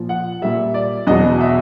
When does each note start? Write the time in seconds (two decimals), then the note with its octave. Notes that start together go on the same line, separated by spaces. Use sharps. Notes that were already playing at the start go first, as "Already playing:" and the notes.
Already playing: A#2 F3
0.09 F#5
0.42 A#2 G3 E5
0.74 D5
1.07 E2 B2 F#3 D#5
1.40 E5